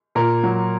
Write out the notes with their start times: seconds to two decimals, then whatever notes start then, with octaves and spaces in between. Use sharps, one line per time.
0.15 A#2 A#4
0.43 F#3